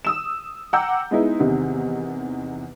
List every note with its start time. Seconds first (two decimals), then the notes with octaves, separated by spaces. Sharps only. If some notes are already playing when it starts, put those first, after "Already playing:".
0.05 D#6 E6 E7
0.73 F#5 G5 A#5 D6 E6 G6
1.11 G#3 B3 D#4 E4
1.39 E2 C3 D#3